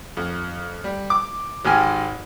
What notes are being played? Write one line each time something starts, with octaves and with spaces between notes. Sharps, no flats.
F2
G3
D6
G#1 G#2 G4 G#5 F6